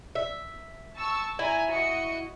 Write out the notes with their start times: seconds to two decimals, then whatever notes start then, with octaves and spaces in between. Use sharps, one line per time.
0.15 E5
0.96 A5 C#6 E6
1.39 E4 G#5 A#5
1.71 F#4 D#5 C#7